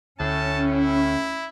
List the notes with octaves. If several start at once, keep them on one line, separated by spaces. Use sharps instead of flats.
D2 A2 C#4 A5
E4